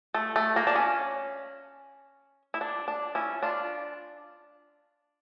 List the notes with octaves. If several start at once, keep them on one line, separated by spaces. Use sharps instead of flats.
A3
A3
A#3
D4
C#4
E4
D4
D4
C#4 E4
D4 F4